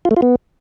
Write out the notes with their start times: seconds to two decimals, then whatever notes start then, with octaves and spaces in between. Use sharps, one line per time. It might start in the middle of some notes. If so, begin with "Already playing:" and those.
0.05 F4
0.11 A3
0.17 F4
0.22 B3